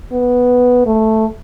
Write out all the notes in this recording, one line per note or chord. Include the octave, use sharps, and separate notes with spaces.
B3
A3